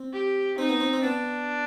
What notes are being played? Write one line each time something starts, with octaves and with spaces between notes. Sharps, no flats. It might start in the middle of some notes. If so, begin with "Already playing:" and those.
Already playing: C4
G4
C4 D#4
B3
C4
C4
B3 D4